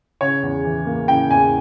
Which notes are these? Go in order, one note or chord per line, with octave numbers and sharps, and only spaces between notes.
C#3 C#5
E2
E3
A#3
C#3 G5
E2 G#5